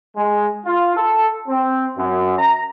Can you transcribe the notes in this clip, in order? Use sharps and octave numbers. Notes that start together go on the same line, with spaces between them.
G#3
F4
A4
C4
F#2
A#5